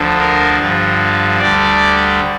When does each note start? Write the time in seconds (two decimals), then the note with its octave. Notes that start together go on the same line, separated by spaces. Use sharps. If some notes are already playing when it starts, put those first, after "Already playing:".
Already playing: D2 D3 F3
0.20 A#4
0.59 G2 D3 F3
1.39 D2 D3 G3 D5